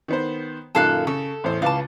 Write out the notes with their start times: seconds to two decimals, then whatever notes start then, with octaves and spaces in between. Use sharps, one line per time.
0.08 D#3 B3 C5
0.75 F#2 A#2 D#3 A4 F5 F#6
1.07 C#3 A4
1.44 A1 E2 C5
1.62 C#2 B4 F5 A5 D6